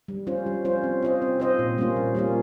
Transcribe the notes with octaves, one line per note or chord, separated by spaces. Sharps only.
G3
C#4 F4 C5
G3
C#4 F4 C5
C4
F4 C5 D#5
C4
F4 C5 D#5
A#2
G3 A#3 C#4 F4
A#2
G3 A#3 C#4 F4